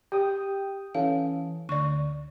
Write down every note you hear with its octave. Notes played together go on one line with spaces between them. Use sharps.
G4 G5 D#6
E3 C#4 A4 F5
D2 D5 C#6